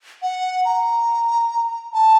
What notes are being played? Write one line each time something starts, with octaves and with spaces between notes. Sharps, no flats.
F#5
A#5
A5